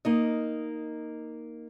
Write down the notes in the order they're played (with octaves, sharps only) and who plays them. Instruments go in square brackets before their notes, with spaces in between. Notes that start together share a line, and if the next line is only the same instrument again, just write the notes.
[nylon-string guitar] A#3 D#4 D#5